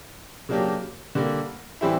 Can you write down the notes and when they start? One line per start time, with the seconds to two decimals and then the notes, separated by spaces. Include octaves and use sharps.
0.49 C#3 F#3 A#3 D4 G4
1.15 D3 G3 A#3
1.81 A2 E3 G3 C4 E4